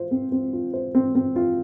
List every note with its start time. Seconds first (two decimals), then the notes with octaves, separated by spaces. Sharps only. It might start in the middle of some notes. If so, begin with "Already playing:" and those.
Already playing: F4 C5
0.11 C4
0.32 C4
0.53 F4
0.73 C5
0.95 C4
1.15 C4
1.36 F4